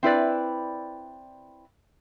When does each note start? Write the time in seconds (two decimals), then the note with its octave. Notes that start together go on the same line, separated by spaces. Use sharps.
0.03 C4 E4 B4 D5